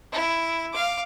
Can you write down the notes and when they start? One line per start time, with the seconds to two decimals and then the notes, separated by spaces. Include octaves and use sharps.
0.12 E4
0.73 F5 D6